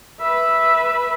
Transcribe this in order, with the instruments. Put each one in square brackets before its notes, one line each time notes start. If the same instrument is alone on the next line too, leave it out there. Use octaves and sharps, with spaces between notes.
[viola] B4 E5